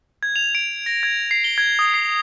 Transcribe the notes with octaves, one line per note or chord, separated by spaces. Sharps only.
G#6
F7
D7
A#6
G#6
C7
G7
G#6
D#6
C7